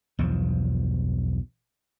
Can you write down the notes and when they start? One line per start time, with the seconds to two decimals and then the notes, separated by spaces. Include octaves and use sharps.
0.19 B1 E2 G2 F3